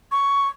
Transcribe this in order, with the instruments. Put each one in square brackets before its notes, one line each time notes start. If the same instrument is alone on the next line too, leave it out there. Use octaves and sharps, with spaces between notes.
[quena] C#6